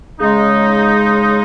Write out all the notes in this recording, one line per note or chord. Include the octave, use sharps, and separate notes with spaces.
C#3 G#3 D#4